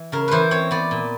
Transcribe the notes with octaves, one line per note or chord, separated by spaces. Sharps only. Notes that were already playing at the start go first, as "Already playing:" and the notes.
Already playing: E3
C#3 A#4
E3 B4 C5
C4 C#5
B3 D5
A#2